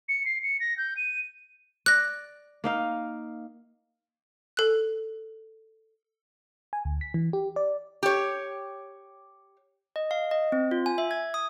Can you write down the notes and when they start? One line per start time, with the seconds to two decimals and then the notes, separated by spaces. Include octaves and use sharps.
0.09 C#7
0.25 C7
0.43 C#7
0.60 A#6
0.77 G6
0.97 D#7
1.86 D5 F#6 A#6
2.64 A#3 D#4 F5
4.57 A4 F#6
6.73 G#5
6.85 D2
7.01 B6
7.14 E3
7.33 G4
7.56 D5
8.03 G4 C#5
9.96 D#5
10.11 F5
10.31 D#5
10.52 C4
10.71 F4
10.86 G#5
10.98 E5
11.11 G#6
11.34 D#6